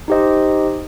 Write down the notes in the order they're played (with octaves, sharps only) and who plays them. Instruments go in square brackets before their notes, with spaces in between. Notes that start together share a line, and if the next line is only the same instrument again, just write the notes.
[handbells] D#4 G4 C5 D#5